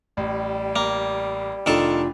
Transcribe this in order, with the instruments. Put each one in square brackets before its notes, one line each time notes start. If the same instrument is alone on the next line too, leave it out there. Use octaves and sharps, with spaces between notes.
[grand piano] A1 [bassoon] G3
[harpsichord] A#3
[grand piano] F1 D4 [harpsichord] D#3 A4 [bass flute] F4